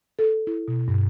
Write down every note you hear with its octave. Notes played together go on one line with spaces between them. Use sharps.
A4
E4
B2
G2